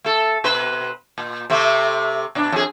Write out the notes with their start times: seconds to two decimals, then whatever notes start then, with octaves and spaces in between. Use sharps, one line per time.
0.04 A3 A4
0.44 B2 B4 C5
1.18 A#2
1.50 C3 A3 C4
2.35 B2 D4
2.52 F2 G#4